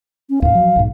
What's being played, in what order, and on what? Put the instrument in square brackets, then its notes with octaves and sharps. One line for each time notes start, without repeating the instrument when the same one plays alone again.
[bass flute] C#4
[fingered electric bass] D#2 A2 [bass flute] F5
[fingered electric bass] F3 F#3
B1 G#2